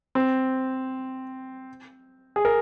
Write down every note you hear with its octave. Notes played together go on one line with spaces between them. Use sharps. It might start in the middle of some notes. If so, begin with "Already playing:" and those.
C4
G#4
A#4